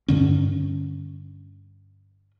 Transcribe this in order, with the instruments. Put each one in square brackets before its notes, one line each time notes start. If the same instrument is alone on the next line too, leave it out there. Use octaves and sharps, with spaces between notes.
[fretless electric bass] G2 D3 C#4